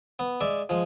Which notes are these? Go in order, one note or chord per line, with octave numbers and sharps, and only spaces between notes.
B3
G#3 D5 E5
F3 G#3